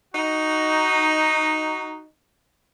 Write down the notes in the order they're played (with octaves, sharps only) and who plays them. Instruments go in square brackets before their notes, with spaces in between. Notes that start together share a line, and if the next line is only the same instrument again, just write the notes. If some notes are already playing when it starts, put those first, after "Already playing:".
[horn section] D#4 F#4